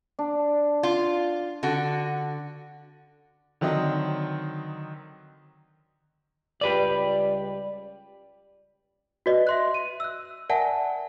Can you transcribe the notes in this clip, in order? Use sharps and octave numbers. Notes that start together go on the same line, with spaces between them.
D4
F4
D3 F#4
D3 D#3 F#3 C4 D#5
C#2 G3 G4 B4 D5
F#4 B4 D5 D#5
E5 C6 F#6
D#7
E6 F#6
A#4 D5 E5 F#5 G#5 A5